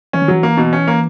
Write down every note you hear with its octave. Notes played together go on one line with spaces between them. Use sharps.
E3 C#4
D#3
E3 F#3
A#3
B2
C#4
A#3